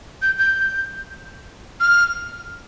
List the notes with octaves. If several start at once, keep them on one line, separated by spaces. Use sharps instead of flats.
G6
G6
F6